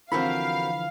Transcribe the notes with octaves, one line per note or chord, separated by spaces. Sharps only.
D3 E3 F3 C4 F#4 A#4 F5 B5